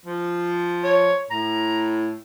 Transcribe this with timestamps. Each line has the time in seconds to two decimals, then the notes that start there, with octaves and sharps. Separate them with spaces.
0.06 F3
0.84 C#5
1.31 A2 A#5